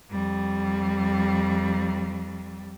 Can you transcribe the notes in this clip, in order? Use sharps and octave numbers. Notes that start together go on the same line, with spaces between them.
F2 G3